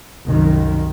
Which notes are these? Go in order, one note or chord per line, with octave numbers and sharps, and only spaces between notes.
C2 F#2 D#3